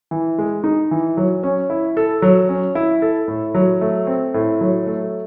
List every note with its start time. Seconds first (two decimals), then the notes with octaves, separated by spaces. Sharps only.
0.11 E3
0.38 G#3
0.64 D#4
0.91 E3
1.17 F#3
1.43 C#4
1.70 E4
1.97 A4
2.22 F#3
2.49 C#4
2.75 E4
3.02 A4
3.28 A2
3.55 F#3
3.81 A3
4.07 C4
4.34 A2
4.61 F#3
4.87 A3